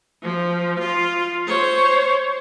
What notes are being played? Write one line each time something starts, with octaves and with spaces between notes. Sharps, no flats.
F3
F4
C5 C#5